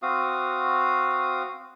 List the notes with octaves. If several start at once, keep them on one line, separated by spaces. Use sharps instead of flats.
C4 F#4 F5 D#6